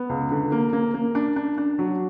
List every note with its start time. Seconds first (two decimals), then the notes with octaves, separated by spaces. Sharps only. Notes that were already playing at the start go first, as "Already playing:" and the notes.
Already playing: B3
0.09 C#2
0.31 D3
0.52 A#3
0.73 A#3
0.94 A#3
1.15 D4
1.36 D4
1.58 D4
1.79 F#3